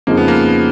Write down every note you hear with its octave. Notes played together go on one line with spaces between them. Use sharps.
F2 C#3 F3 G#3 A#3 D#4
B3
A#3